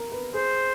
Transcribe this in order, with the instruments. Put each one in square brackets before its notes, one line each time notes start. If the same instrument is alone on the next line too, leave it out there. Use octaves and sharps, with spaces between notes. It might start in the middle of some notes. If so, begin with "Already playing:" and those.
Already playing: [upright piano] A#4
B4
[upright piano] G#4 [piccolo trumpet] C5